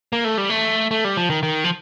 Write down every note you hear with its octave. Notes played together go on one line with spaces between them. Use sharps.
A#3
A3
G3
A3
A3
G3
F3
D#3
D#3
F3